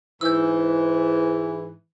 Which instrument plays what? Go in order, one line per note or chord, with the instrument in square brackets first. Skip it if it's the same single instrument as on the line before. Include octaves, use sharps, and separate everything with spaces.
[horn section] G#2 E3 [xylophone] E6 G6